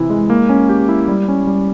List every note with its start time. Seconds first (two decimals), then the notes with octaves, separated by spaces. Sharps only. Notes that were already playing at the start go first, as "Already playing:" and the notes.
Already playing: C3 E3 E4 G4
0.10 G#3
0.30 A#3
0.49 C#4
0.69 G4
0.89 E4
1.08 G3
1.28 C#4
1.47 G3